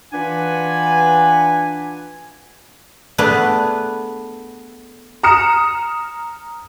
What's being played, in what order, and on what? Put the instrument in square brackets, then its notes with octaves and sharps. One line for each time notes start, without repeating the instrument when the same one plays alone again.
[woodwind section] E3 D4 F4 B4 F#5 G#5
[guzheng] A3 B3 D4 G#4 B4
[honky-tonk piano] A#5 D#6 F6 C#7 E7